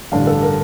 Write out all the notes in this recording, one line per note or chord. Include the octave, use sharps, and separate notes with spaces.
A1 G2 D3 G3 D4 F5
A4
A#4